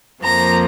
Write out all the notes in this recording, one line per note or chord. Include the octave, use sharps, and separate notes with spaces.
F2 F3 A#3 A#5